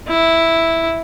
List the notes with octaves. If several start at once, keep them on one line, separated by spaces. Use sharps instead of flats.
E4